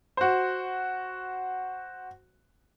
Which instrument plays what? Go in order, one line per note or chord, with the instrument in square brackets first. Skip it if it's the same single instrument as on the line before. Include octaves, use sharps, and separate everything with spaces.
[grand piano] F#4 C5